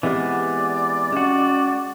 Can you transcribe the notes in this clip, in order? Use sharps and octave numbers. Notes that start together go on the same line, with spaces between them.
E3 G#3 B3 C4 G4 D5
G#3 C#4 F#4